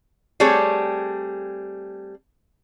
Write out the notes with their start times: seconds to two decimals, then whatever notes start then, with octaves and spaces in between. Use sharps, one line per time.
0.40 G3 A3 C4 G#4 C#5